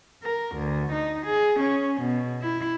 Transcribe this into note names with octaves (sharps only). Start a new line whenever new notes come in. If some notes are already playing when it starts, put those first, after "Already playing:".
A#4
D2
D#4
G#4
C#4
B2
E4